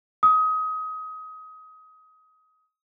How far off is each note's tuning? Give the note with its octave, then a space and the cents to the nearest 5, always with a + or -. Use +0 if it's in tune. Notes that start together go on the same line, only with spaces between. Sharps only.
D#6 +25